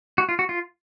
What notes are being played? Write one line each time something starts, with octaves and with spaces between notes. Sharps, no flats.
F#4
F4
F#4
F4